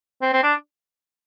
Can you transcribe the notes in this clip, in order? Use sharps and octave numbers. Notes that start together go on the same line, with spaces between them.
C4
C4
D4